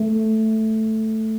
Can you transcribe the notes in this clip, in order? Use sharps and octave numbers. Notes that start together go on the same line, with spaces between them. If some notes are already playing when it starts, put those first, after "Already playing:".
Already playing: A3